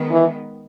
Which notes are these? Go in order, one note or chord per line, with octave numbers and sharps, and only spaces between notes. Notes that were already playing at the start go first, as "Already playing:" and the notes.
Already playing: D#3 G#3 B3
E3